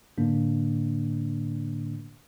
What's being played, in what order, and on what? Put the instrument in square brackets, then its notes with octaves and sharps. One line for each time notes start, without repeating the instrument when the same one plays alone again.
[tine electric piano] A2 D3 A#3 D4